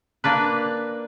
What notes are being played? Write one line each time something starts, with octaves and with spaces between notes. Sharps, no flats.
A#3 D4 B4